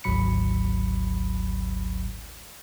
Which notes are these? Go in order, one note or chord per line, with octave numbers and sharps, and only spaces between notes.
G#1 D2 F#3 B5 C#7